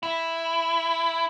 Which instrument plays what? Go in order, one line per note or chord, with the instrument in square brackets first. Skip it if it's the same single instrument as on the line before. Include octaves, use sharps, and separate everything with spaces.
[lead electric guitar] E4